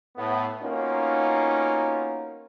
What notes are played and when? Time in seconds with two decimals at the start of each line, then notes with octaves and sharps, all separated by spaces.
0.16 A2 B3
0.61 A#3 B3 C#4 D#4 F4 F#4